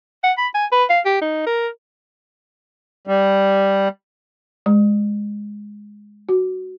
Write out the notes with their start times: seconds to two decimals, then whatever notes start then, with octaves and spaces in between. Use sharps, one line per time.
0.24 F#5
0.37 B5
0.55 G#5
0.72 B4
0.90 F5
1.05 G4
1.21 D#4
1.47 A#4
3.07 G3
4.66 G#3
6.29 F#4